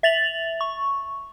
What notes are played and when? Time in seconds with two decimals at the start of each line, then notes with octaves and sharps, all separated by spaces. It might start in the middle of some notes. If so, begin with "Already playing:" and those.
0.03 E5 A6 F7 F#7
0.61 C#6